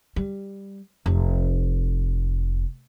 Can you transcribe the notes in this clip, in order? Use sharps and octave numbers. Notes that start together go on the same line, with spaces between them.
G3
F1